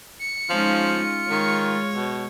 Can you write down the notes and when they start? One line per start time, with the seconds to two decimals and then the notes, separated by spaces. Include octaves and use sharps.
0.19 C#7
0.50 F3 G#3 C#4 D#4 F4
1.30 D#3 G#3 C#5
1.95 B2